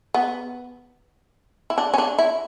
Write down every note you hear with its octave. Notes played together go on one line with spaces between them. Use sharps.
B3
E4
D4
C#4
D4
E4